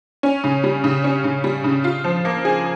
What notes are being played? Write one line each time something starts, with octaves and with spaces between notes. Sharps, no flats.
C#4
C#3
G3
C#3
C#4
C#3
G3
C#3
F4
F3
A#3
G#4